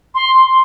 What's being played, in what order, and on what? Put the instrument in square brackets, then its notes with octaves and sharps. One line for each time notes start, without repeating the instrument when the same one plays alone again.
[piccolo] C6